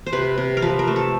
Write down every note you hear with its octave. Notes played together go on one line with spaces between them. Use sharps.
C5
C3 B4
C3
A#4
F3 B4
A#4
A3
A4